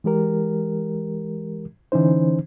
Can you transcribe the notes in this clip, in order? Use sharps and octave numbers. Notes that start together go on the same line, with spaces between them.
E3 G#3 G4 A#4
D3 E3 C#4 D#4 C5